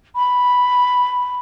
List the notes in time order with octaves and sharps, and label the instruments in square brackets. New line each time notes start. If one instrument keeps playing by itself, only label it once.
[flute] B5